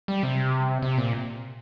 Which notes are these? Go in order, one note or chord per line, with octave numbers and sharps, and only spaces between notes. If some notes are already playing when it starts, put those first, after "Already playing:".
G3
C3
C3
A#2